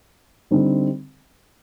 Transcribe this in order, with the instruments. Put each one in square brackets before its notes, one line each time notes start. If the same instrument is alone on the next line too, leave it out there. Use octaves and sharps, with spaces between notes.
[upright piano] D3 G3 C4 D#4